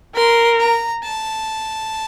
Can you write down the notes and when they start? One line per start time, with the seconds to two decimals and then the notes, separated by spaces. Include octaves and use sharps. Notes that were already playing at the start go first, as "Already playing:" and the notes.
0.16 A#4 C6
0.60 A#5
1.03 A5